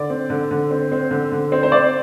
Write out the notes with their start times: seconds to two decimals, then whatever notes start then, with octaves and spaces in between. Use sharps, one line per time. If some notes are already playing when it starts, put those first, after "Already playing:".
Already playing: D3 D5
0.10 C4
0.30 D3
0.51 D3
0.71 C4
0.92 C4
1.11 D3
1.32 D3
1.52 C4
1.63 C5
1.72 C4 D5